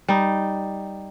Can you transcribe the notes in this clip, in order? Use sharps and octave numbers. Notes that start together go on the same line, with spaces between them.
G3 D#4